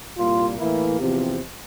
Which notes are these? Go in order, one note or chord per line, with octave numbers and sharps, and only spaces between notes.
C2 A#2 G3 A#3 F4
A2 E3 A#3 E4
E2 C3 F3 C4 G4